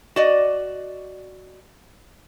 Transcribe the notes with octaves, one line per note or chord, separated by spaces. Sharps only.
F#4 D5 D#5